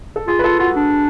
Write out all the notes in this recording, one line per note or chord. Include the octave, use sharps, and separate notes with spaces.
A4
F4 G#4
B4
F4 A4
F4 F#4
D4